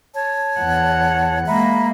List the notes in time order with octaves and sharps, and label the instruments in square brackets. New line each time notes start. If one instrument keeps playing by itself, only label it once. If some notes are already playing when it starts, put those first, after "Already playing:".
[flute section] C#5 A5
[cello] E2 F#5
[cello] G#3 A#3 [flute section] E5 A#5 B5